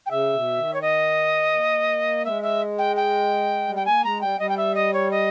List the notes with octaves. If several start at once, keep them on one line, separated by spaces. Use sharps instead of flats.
G5
C#3 E5
B2
D#3
C#5
D#5
A#3
G#3 E5
E5
G5
G5
G3
G5
A#3 G#5
G#3 A#5
G3 G5
G3 D#5
G5
E5
D#5
C#5
D#5